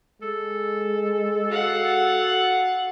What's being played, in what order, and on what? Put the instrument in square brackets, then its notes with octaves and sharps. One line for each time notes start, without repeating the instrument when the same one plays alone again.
[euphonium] G#3 [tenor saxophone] A4
[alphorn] F#4 [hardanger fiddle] F5 F#5